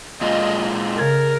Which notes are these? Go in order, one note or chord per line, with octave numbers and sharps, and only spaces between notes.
A#2 G#3 F4 D#5
C#3 A#4 G#6 A6